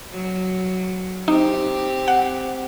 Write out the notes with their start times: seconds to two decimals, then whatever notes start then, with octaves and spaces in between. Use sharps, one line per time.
0.13 F#3
1.28 C4 D#4 G4
2.08 F#5